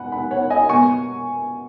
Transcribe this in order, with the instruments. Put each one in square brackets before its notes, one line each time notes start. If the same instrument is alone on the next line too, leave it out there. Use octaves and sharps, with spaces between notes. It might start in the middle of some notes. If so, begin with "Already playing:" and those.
Already playing: [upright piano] B2 F#5 G#5 B5
F#5 B5
C#5 F#5
D#5 G#5
B2 B3 G#5 C#6